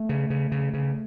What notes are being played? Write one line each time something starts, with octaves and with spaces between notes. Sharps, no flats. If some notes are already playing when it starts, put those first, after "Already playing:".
Already playing: A3
C#3
C#3
C#3
C#3